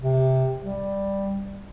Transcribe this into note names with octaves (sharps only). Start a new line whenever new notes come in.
C3
G3